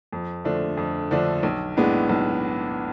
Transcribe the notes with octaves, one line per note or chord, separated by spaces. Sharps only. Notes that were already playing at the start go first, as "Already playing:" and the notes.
F2
D3 F3 A3 D4
F2
D3 F3 A3 D4
B1
A2 G#3 B3 D4
B1